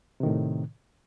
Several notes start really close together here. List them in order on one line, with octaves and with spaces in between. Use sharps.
C3 D#3 A2